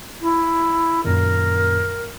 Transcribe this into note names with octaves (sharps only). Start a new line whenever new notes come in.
E4
F#2 A#2 D#3 A#4